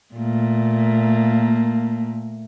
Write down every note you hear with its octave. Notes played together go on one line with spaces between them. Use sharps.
A#2 A3 A#3